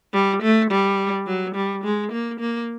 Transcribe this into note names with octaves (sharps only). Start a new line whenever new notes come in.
G3
A3
G3
F#3
G3
G#3
A#3
A#3